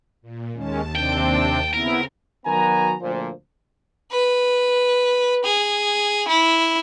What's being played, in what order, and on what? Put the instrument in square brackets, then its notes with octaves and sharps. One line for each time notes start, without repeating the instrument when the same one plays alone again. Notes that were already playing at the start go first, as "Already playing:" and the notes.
[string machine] A#2
[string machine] D#2 A5 [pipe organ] D#3 G#3 C#4
[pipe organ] C3 C4 D4 [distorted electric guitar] G5
[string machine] C#3 C4 [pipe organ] B3 E4 [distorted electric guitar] A#4
[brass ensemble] D#3 F#3 B3 F#4 G#5 A#5
D2 A#2 F3 C5
[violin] B4
G#4
E4